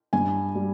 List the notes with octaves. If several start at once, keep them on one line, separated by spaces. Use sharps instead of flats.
G2 G#5
G3